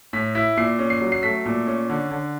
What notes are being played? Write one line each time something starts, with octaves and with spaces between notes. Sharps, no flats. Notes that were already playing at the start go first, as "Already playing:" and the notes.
A2 B6
E4 B6
A#2 C7
C#4
C7
F#3
C7
A3 B6
A#2
C#4
D3
D3